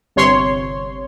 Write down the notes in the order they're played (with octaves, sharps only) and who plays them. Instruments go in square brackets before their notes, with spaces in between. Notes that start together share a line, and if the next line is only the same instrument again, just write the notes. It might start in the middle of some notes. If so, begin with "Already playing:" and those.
[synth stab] G1 C3 C#5 C6